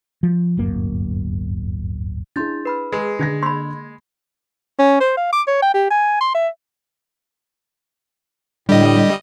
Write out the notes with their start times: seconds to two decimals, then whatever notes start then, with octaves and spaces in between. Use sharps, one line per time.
0.23 F3
0.57 D1 G1 F#2 A#3
2.36 D4 E4 G#4 C6 G6 A6
2.65 B4 B5 F6
2.92 G#3 G#4 B4 B5
3.19 D3 G#4 G#6 A#6
3.43 A#3 B5 C6
4.79 C#4
5.01 C5
5.17 F5
5.33 D6
5.48 C#5
5.62 G5
5.74 G4
5.90 G#5
6.21 C6
6.35 E5
8.69 A2 D3 G3 D#5